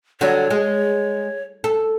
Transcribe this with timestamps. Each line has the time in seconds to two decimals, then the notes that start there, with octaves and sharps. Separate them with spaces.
0.21 D3 F#3 G3 C#5
0.50 G#3
1.64 A4